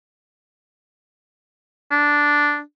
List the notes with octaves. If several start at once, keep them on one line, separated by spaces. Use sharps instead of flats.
D4